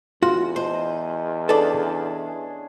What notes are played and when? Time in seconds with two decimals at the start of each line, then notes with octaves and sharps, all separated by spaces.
0.23 E2 F4 F#4
0.56 C5 D#5 A5
1.49 C#4 D4 G#4 A4 B4 D5